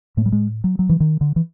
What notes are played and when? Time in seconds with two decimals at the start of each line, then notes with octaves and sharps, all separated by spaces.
0.17 A2 A3
0.26 G3
0.32 G#3
0.64 F#3
0.79 F#3
0.89 E3
1.00 D#3
1.21 D3
1.36 E3